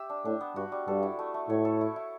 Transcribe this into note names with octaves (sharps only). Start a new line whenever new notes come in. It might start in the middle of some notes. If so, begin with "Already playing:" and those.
Already playing: G4 E5
D4
A2 D4
B3
G2 F#4
G3
G2 A4
E4
A3
A3
A2 C#5
A4
E4
E4